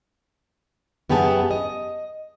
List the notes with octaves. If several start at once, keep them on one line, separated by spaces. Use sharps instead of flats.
F#2 B3 G4 G#4 A5
D#5